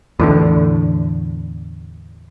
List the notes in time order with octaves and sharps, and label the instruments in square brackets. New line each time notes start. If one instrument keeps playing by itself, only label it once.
[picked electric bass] E2 A2 D3